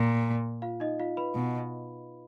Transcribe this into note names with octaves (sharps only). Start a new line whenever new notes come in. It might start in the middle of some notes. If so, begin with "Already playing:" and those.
Already playing: A#2
F4 F5
D#4 D#5
F4 F5
B4 B5
B2